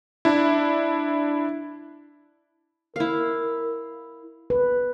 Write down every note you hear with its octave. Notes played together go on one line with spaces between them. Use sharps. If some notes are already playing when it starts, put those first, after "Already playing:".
D4 E4
E4 A#4 F5
B4